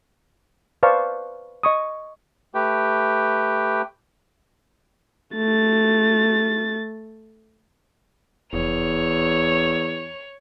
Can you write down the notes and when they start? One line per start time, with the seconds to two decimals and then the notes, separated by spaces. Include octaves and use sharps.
0.83 B4 C5 D5 F5 A5 C#6
1.63 D#5 C#6 D#6
2.55 A3 G4 B4 G5
5.35 A3 A6
8.53 F1 E2 C#5 F7